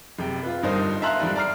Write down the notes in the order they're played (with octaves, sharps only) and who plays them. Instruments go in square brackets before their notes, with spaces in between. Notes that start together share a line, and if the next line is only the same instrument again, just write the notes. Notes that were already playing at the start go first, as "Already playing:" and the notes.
[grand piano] F#1 C3 G5
F4 B4
G1 G2 D#4 A#4 C5 D#6
E5 F5 A5 A#5 C6 F#6
F2 G#2 G3
D5 A#5 F6 C7